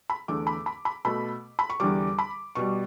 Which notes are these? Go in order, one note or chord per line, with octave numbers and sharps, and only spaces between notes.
B5
E2 D3 A3 D6
B5
B5
B5
B2 A3 B5
B5
C#6
E2 D3 G3 D6
B5
B2 G3 C#6